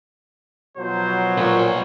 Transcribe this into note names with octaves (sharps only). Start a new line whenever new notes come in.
B2 F3 F#3 C5
A#2 B3 C#5